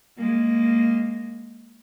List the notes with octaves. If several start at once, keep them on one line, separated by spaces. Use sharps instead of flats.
G#3 A#3